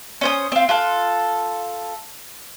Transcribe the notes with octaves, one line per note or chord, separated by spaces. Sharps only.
C#4 C5 D#6
C4 F4
F4 A4 F#6